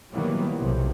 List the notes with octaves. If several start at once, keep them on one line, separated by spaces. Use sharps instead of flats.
D#3 E3 F#3 G3 A#3 B3
B1 C3 F#3